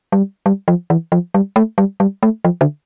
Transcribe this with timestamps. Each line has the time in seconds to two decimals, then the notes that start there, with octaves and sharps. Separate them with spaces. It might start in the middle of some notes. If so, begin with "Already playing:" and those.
0.12 G3
0.46 G3
0.68 F3
0.90 E3
1.12 F3
1.34 G3
1.56 A3
1.78 G3
2.00 G3
2.23 A3
2.44 F3
2.61 D3